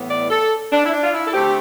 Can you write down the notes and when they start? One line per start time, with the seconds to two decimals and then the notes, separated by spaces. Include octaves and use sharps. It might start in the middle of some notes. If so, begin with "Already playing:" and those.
Already playing: A2 E3 B3
0.10 D5
0.31 A4
0.72 D4
0.85 E4
0.93 D4
1.04 F4
1.13 E4
1.27 A4
1.33 D3 A3 C4 G4